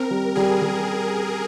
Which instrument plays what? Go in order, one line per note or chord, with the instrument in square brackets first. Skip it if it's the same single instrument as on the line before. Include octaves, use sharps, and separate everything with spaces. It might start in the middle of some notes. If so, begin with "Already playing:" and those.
Already playing: [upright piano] C4 [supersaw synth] A#4
[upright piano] G3
[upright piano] G3 [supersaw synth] G#4
[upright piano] G3